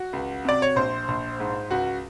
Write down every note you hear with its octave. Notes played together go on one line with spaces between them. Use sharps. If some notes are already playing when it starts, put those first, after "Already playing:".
Already playing: F#4
C#2
C3 D5
C#5
A#1 C5
A#1
G#2
C#2 F#4